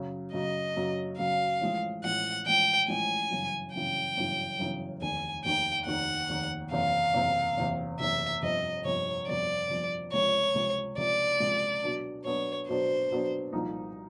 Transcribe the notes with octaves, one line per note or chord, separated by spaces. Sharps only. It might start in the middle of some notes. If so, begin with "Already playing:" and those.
Already playing: F#2 C#3 F#3
F#2 C#3 F#3 D#5
F#2 C#3 F#3
F#2 C#3 F#3 F5
A1 A2 F3 G#3
A1 A2 F3 G#3 F#5
A1 A2 F3 G#3 G5
A1 A2 F3 G#3 G#5
G1 F#2 C#3 E3
G1 F#2 C#3 E3 G5
G1 F#2 C#3 E3
G1 F#2 C#3 E3
F1 D#2 D#3 G#5
F1 D#2 D#3 G5
F1 D#2 D#3 F#5
F1 D#2 D#3
F#1 E2 C3 F5
F#1 E2 C3
F#1 E2 C3
F#1 E2 C3 E5
G1 F2 C3 D#5
G1 F2 C3 C#5
G1 F2 C3 D5
G1 F2 C3
C#2 C3 F3 G#3 C#5
C#2 C3 F3 G#3
C#2 C3 F3 G#3 D5
C#2 C3 F3 G#3
B2 F#3 B3 D4
B2 F#3 B3 D4 C#5
B2 F#3 B3 D4 C5
B2 F#3 B3 D4
C2 A#2 F3 A#3 D#4